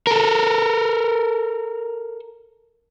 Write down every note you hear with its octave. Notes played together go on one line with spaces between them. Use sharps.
A4 A#4